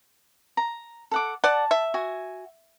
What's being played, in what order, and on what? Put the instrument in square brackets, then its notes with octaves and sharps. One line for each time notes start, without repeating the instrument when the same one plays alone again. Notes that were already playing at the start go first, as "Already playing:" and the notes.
[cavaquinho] A#5
A4 F#5 D6
[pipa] D5 F#5 [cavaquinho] A5
[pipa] E5
[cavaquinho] F#4 G#5